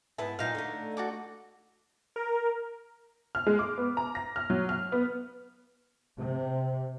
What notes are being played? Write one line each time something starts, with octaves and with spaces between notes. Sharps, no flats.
G#2 B3 E4 A5
A#2 F#3 D#4 F5
D3 A3
F#4 A4 D6
A#4
F6
G#3
D6
B3
A#5
A#6
F6
F#3
F6
B3
C3